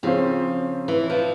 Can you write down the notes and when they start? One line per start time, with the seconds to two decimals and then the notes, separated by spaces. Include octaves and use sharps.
0.03 C#3 F3 C4 F4 C5
0.88 E3
1.10 F3